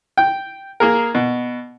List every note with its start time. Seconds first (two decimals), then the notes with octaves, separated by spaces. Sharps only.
0.17 G5
0.80 A#3 G#4 A#4
1.15 B2